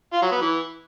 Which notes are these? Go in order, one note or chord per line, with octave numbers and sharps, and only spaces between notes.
F4
F#3
B3
E3